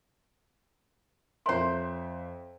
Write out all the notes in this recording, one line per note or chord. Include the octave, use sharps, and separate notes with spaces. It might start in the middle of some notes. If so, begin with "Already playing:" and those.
F2 A#4 C5 C#5 E5 C6